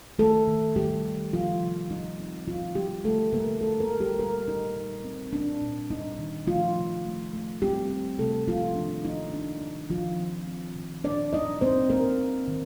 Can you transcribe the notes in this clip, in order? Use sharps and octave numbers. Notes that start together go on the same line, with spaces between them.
D#3 A3 A4
D#3
D#3 G3 G4
D#3
D#3 F3 F4
C3
G3 D#4
C4
D#3 F3 F4
G3 A#3 G4
D3 A3 A4
D3 A#3 A#4
A3 A4
A#3 A#4
A3
G3 G4
A#2 A#3 A#4
A#2 D#4
G3
C4
A#2 D4
A#2
G3 D#4
D#3
F3 A3 F4
C3
A3
A3
G3 C4 G4
C4
C3 A3 A4
F3 A#3 F4
D#3 D4
A#3 D#4
G3 D4
D#3
D#3 F3 F4
C4
C4
D#3
A#2 D4 D5
G3 D#4 D#5
A#3 C4 C5
A#3 A#4
C4
D#3